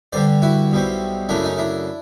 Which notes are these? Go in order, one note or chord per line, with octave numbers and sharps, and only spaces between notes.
G2 D3 G3 C5 D5
E4 F#4
B1 B2 G3 C4
F#2 C#3 F#3 A3 D4 E4
C#4 D#4
D4 E4